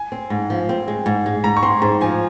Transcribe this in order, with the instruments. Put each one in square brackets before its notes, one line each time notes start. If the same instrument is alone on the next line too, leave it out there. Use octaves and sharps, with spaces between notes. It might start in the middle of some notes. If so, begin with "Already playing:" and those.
Already playing: [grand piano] G#5
[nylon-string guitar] C4
G#2
F3
C4
G#3
G#2
G#3
[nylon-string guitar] G#2 [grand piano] A#5
[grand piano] C#6
[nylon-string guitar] C4 [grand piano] C6
[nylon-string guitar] G#2 [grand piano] A#5
[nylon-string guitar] F3 [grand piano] G#5